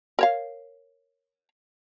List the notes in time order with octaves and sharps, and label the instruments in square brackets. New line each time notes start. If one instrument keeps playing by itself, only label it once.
[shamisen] A#4 C#5 F5